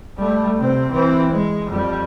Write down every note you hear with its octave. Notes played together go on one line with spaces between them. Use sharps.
G3 A3
C3 C4
E3 C4
G#3
F2 G3